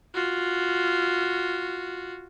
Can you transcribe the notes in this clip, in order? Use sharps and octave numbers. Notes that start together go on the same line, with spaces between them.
F4 F#4